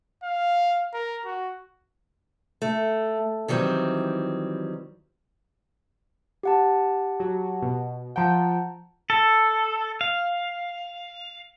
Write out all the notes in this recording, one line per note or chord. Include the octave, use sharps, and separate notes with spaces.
F5
A#4
F#4
A3
D#3 E3 F#3 G3 C4
G4 F#5 A5
F#3 F#4
B2
F3 F#5 G5 A5 A#5
A4
F5